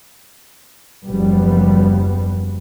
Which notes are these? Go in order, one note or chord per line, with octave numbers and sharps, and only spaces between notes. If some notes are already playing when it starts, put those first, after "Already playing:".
F#1 D#2 F3 G3 B3